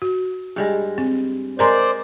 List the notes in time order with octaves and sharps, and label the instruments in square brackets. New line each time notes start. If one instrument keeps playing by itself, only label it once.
[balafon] F#4
[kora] G2 G3 G#3
[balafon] C4
[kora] G#3 G#4 [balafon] A#4 A#5 C6 [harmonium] C5 D5